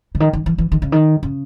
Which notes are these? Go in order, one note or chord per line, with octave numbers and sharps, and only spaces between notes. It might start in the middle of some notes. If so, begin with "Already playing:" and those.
C#3
D#3
D#3
E3
E3
D#3
C#3
D#3
C#3